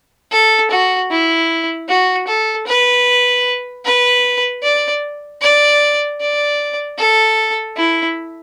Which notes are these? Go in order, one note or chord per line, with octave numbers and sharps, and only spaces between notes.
A4
F#4
E4
F#4
A4
B4
B4
D5
D5
D5
A4
E4